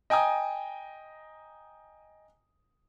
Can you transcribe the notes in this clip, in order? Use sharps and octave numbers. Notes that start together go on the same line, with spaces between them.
D#5 G5 G#5 A#5 D#6